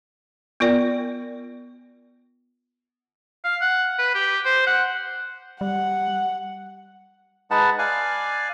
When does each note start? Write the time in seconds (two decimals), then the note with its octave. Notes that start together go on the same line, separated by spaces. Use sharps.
0.60 B3 F4 A#4 D5 G5
3.44 F5
3.61 F#5
3.99 B4
4.15 G4
4.45 C5
4.67 F#5
5.61 G3 F#5
7.51 G#3 D#4 B4 F#5 A5
7.79 D5 F5 G#5 F#6